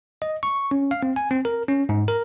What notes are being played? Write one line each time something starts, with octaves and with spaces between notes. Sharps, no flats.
D#5
C#6
C#4
F5
C4
G#5
C4
A#4
C#4
G#2
A#4